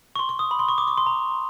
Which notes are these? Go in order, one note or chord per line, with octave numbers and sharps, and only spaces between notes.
C#6
C6
C#6
D#6
B5
C6
C#6
D6
C#6
C6
A#5